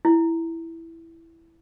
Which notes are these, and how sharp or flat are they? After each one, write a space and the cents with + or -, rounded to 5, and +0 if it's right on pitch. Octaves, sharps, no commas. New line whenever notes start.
E4 +0